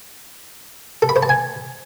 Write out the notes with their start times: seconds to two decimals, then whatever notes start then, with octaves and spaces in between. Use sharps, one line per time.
1.02 A4
1.09 B5
1.16 C5
1.23 A5
1.29 G#5